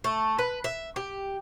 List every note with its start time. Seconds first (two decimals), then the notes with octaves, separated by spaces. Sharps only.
0.04 A3
0.39 B4
0.64 E5
0.96 G4